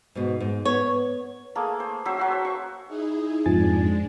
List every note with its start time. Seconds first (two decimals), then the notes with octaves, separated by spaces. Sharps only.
0.15 G#2 B2
0.40 G#2
0.65 B3 C#5
1.55 A3 A#3 G#4
1.80 C5
2.05 F#3 C#4 C5 E5
2.18 F#3 F#4 E5
2.31 C5
2.45 C#6
2.87 D#4 E4 G#4
3.46 F2 G#2 F3 G#3 D4 G#5 A6